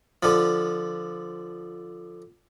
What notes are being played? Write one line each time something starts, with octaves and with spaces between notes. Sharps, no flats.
D3 F3